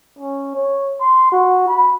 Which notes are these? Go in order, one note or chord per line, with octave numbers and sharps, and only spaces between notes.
C#4
C#5
C6
F#4
B5